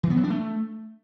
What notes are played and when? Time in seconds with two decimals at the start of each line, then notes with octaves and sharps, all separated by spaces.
0.03 E3
0.10 B3
0.17 F#3
0.24 D4
0.30 A3